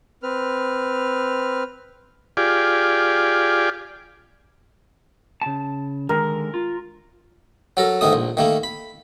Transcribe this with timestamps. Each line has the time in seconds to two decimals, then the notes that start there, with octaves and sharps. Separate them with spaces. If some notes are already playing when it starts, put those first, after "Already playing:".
0.23 C4 B4 F6
2.37 F4 G4 G#4 D5
5.42 C#3 A5
6.09 D3 D#3 G#3 A#4
6.54 F4
7.77 F#3 A4 A#4
8.01 G#2 D#3 A3 D#6
8.13 A#1
8.37 D#3 A3 A#3
8.63 B5